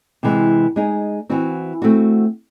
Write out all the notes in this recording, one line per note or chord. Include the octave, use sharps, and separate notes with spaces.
C3 E3 G#3
G#3 D#4 G#4
E3 C4 F#4
A3 C4 F#4